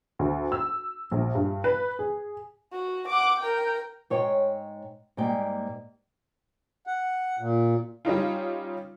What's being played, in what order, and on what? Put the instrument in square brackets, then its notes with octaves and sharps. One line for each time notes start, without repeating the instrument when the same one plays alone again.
[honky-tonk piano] D2
E6
A#1
G2
B4
G#4
[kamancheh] F#4
F#5 D6
A#4 G5
[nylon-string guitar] G#2 C#5 G5
G#2 G3 A#3 G5
[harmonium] F#5
A#2
[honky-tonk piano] G3 C#4 D#4 F4